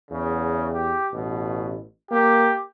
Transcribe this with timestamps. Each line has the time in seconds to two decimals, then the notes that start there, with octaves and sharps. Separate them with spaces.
0.11 E2 C#3
0.73 G4
1.13 A1 B2
2.11 A#3 G4